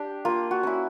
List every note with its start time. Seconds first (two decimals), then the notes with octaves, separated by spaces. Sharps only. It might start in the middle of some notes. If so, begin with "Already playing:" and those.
Already playing: D4 G4
0.25 A#3 F4
0.51 F#4
0.63 C#4 E4